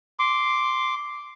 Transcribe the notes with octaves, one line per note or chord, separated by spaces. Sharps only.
C6 D6